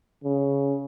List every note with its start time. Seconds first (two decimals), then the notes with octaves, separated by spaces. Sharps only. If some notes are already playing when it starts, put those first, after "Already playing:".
0.24 C#3